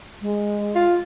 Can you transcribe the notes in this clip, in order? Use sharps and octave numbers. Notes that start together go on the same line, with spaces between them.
G#3
F4